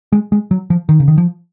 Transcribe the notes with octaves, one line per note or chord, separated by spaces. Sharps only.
G#3
G#3
F#3
F3
D#3
C#3
D#3
F3